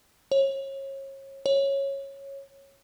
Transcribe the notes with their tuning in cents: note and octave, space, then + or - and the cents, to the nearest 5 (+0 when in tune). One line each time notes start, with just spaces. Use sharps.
C#5 -30
C#5 -10